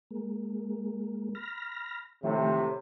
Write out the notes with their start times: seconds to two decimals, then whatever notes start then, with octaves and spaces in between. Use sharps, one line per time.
0.11 G#3 A#3
1.35 B5 F6 A#6
2.23 A2 C3 D#3 F3 A3